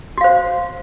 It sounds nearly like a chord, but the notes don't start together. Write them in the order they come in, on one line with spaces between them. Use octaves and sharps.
F#4 F5 C5